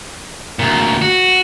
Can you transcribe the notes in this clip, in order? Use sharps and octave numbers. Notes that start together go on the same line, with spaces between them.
D2 A#2
F#4